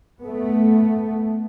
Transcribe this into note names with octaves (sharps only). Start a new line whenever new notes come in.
A3 B3